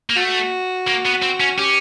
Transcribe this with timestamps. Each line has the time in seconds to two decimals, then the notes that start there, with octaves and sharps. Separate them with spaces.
0.10 A#3
0.16 A3 F#4
0.87 A#3
1.05 B3
1.22 C4
1.40 C#4
1.58 C#4 G4